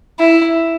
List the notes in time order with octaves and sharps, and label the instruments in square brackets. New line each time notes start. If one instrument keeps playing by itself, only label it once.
[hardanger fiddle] E4